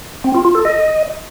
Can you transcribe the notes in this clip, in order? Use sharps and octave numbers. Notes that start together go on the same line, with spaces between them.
C4
F4
F4
A4
D#5